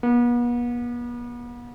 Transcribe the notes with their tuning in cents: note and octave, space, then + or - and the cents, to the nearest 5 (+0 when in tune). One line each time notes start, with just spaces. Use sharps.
B3 -40